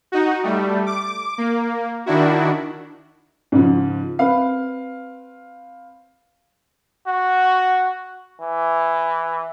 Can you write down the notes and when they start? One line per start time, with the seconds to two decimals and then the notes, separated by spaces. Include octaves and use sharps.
0.12 D#4 F#4
0.43 G3 A3
0.86 D6
1.38 A#3
2.06 D#3 D4 E4 F#4
3.52 G#2 C#3 F3
4.19 C4 B4 F5
7.07 F#4
8.41 E3